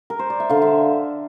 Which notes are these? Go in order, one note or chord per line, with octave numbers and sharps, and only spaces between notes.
A#4
C5
D5
E5
D3 F5
E5